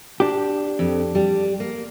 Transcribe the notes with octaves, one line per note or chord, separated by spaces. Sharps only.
D4 G4
F2
G3
A#3